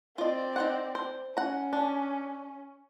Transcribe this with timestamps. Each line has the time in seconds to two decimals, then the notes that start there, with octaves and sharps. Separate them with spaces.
0.18 C4 F4 D5 D#5
0.56 D#4 C5 F#5
0.95 C5
1.37 C#4 F#5 A#5
1.73 D4